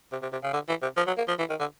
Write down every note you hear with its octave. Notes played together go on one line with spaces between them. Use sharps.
C3
C3
C3
C#3
D3
E3
C3
F3
F#3
A#3
F3
E3
D#3
D3